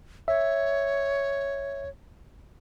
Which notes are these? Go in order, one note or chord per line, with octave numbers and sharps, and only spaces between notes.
C#5 E5